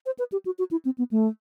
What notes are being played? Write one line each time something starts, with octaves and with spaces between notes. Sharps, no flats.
C5
B4
G4
F#4
F#4
E4
C4
B3
A3